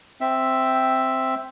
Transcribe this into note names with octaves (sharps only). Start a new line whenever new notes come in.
C4 E5